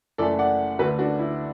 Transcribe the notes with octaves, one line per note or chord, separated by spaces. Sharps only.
F#1 F#2 E3 A3 A4 D5
D5 F#5
D2 D3 A3 F#4 B4
D4 F#4
E4